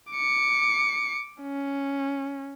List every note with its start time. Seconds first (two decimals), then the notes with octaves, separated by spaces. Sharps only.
0.12 D6 C#7
1.42 C#4